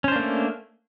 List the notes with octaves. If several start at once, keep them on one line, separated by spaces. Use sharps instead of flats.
A3 A#3 C#4 D4 C5